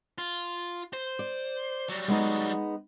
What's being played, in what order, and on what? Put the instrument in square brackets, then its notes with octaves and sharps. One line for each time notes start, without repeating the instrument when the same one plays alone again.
[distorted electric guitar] F4
C5
[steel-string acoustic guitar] D5
[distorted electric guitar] F#3 G3
[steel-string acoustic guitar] G#3 B3 D#4